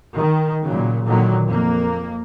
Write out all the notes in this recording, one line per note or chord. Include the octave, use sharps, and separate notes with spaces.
D#3
A#2 C#3 F#3
A#2 D3 D#3 F#3 A#3
F2 A#3